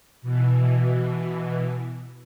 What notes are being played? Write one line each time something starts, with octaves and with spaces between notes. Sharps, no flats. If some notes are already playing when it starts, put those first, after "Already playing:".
B2 E3